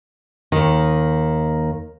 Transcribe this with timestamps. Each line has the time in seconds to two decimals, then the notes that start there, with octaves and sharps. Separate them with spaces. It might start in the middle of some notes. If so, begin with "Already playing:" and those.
0.52 D#2 D#3